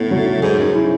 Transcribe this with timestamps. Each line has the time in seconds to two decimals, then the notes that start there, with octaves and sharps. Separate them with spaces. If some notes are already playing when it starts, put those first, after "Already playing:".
Already playing: A2 B3
0.11 F#3
0.42 G#2 G#4
0.59 F#2
0.75 E4